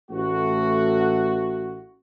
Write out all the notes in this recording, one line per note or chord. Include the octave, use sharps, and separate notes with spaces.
A1 A3 F#4